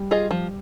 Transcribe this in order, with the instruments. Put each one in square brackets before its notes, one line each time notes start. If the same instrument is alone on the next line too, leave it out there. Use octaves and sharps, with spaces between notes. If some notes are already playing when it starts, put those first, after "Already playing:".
Already playing: [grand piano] G3
[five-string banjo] F4 G#4 D#5
F3